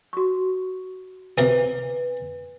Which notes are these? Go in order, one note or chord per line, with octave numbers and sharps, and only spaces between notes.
F#4 C#6
C3 A#4 B4 D#6